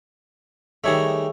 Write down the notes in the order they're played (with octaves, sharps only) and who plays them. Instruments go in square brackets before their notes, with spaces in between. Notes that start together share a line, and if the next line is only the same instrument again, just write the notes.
[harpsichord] D#3 G3 A3 [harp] G#4 C#5 E5